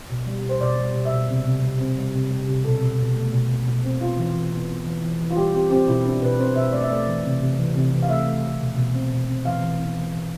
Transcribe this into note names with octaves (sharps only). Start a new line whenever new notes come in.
B2
G3
B2
C5
B2 D5
G3
B2
E5
B2
C3
C3
G3
C4
G3
C3
G3
C3
B2 A4
B2
B2
A3
B2
B2
B2
C4
B3 F4
E3
E3
B3
B3
E3
E3
E3
F4
G3 G4
C4 G4
C4 G4
B2 E4
C4 D4
B2 B4
C4 C5
B2 E5
A3 D5
E5
A3 D5
E3
C3
C3
E3
C3
E3
F5
A3 E5
A3
A3
B2
B2
C4
B2
C4
E3 F5
E3
B3
E3
E3